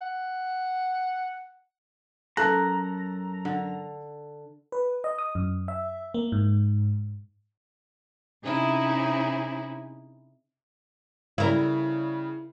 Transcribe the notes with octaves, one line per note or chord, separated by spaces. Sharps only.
F#5
F#2 A4 A5 A#5 F#6
D3
B4
D#5
D#6
F#2
E5
A#3
G#2
C3 C#4 D#4 E4 G#4
C#3 G3 E4 A#4